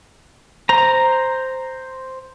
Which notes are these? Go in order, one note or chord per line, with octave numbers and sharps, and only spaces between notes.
C5 A#5